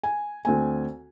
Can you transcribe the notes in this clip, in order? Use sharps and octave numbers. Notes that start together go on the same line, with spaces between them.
G#5
D2 C4 G#5